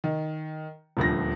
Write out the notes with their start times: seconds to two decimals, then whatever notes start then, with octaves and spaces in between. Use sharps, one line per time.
0.04 D#3
0.97 D#1 D2 F3 A#6